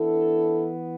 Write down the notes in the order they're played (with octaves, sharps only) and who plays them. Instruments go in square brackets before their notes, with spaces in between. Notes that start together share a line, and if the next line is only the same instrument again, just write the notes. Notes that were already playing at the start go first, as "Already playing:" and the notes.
Already playing: [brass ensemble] E3 B3 D4 E4 A4